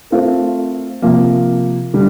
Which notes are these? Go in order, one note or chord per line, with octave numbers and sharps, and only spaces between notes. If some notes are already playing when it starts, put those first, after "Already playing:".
A3 C4 F4 A#4
C3 F3 A#3
D3 G3